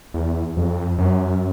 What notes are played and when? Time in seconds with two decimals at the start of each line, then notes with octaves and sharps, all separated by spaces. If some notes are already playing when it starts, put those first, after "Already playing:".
0.14 E2
0.57 F2
0.98 F#2